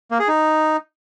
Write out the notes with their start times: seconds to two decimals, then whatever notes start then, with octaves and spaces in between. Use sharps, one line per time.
0.11 A#3
0.20 G#4
0.28 D#4